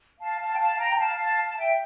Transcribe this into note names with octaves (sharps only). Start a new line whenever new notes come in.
F5 A5
F5 A5
G5
F5 A5
G5 A#5
A#5
F5 A5
F5 A5
A5
E5 G5